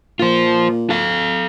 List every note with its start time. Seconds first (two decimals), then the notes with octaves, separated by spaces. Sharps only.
0.19 A#2 F4 C5
0.90 A4 F5